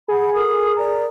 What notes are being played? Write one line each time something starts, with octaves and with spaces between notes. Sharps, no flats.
G#4 F#5 B5
A4 A#4 D#6
A#4 D5 A#5